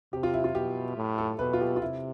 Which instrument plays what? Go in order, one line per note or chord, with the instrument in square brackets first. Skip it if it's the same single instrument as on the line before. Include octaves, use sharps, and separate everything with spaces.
[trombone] C3 [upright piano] G4
[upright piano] F4
E4
F4
[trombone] B2 [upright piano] G4
[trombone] A2
[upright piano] A4
[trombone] B2 [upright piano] B4
[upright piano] F4
G4
F4
[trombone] C3 [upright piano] E4